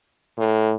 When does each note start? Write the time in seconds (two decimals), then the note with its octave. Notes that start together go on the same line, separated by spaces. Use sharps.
0.38 A2